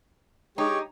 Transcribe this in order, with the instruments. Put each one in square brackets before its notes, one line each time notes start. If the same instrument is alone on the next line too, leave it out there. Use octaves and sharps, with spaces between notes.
[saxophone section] G#3 G4 [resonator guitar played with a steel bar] D#4 [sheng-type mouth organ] C#5